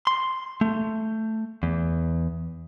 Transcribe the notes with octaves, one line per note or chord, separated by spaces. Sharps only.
C6
A3
E2